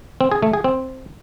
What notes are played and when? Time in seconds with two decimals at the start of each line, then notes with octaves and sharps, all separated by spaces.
0.21 C4
0.32 G#4
0.42 A3
0.53 G#4
0.64 C4